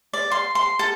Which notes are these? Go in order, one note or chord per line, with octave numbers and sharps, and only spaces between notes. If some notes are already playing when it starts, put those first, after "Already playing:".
D5
C6
C6
A4